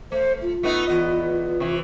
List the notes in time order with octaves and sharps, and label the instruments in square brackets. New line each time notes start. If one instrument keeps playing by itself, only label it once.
[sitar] A3 [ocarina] C5
[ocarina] F4
[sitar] A3 B3 D#4
E2 B3 D#5
C3 E3